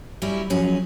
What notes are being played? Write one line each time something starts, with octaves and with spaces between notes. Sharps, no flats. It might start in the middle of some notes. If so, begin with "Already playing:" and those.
F#3 G3 C#4 E4
F3 F#3 C#4 G#4